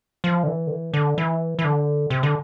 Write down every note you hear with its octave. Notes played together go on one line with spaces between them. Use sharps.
F3
D3
E3
D3
E3
D3
E3
E3
D3
C3
D3